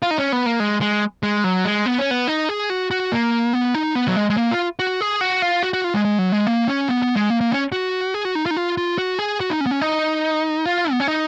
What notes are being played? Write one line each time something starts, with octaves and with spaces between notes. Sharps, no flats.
F4
D#4
C#4
B3
A#3
G#3
G#3
G#3
F#3
G#3
B3
C#4
B3
D#4
G#4
F#4
F#4
A#3
B3
D#4
B3
F#3
G#3
G#3
A#3
F4
F#4
G#4
F#4
F4
F#4
F#4
F4
G#3
G#3
F#3
G#3
A#3
C#4
B3
B3
G#3
A#3
A#3
C#4
F#4
G#4
F#4
D#4
F4
D#4
F4
F4
F#4
G#4
F#4
D#4
C#4
B3
C#4
D#4
F4
B3
C#4
D#4